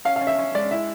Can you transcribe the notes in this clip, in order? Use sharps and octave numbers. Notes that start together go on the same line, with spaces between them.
C#4 F5
F5
C#4
E5
C#4
G#3 D5
E4 E5